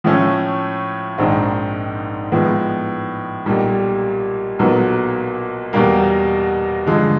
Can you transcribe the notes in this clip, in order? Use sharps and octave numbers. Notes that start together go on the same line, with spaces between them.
A2 F3 A3 C#4
A#1 G#2 D#3 G#3 C4
A2 F3 G#3 B3
B1 A#2 G3
B1 A#2 F#3 B3
E2 B2 G3 A#3
G2 D3 F3 G#3